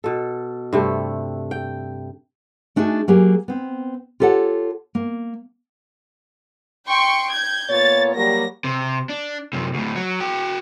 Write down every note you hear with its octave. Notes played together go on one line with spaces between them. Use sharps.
B2 A4
G2 C3 A3
G5
A3 D4 D#4 F#4 G#4
F#3 A#3 G4 G#4
B3 C4
F4 G4 A4 C#5 F#5
A#3
G5 C6 C#6
G6 G#6
A#2 B3 C#5 A6
F#3 G3 A#3 A#6
C3
D4
F#2 C3
D2 A2
F#3
F#4 G5